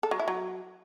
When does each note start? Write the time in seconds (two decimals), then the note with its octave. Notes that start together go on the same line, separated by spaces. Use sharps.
0.03 A4
0.11 F#3
0.19 E4
0.28 F#3